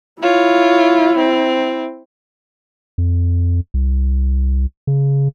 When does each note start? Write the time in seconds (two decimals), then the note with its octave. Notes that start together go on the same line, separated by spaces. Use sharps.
0.22 E4 F4 C#5
1.18 C4
2.98 F2
3.74 C2
4.87 C#3